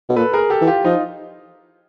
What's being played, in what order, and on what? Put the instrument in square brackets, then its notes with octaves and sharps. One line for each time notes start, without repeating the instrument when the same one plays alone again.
[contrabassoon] B2
[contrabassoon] A#2 [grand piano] A4 B4
[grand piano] G#4 A#4
G4 A4
[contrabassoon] E3
[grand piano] F4 G4
[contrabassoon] F3 [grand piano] D#4 F4